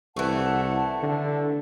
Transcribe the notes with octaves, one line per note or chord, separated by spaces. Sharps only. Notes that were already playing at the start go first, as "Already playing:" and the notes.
C2 E3 A3 F#5 A5
D3